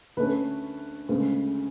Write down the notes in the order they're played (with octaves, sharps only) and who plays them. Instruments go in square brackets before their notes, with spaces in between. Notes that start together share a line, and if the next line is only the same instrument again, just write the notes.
[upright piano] D2 D3 A3 C#4 B4
D2 C#3 G#3